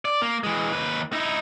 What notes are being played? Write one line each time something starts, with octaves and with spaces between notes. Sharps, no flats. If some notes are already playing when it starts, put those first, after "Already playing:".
D5
A#3
E3 G#3
D#2 B4
D#4 E4